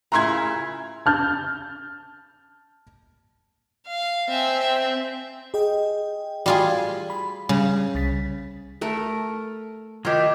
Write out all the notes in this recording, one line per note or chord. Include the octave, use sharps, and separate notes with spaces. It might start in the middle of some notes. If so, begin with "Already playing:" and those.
A#2 C#3 E4 A#5 C6 G#6
A5 F6 G6 A6
F5
C4 E5 G#5
E5
G#4 D#5 G5
G3 F4 F#4 G#4
B5
C#3 G3
C2 A6 B6
A3 A4 A#4
D#3 F#3 F4 G4 E5